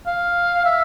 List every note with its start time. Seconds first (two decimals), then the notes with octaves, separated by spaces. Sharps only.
0.06 F5
0.65 E5